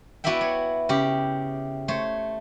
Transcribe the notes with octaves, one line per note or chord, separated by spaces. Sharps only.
B3 E4 F#4 D5 E5 G5
C#5
C#3 G4
A3 C5 C#5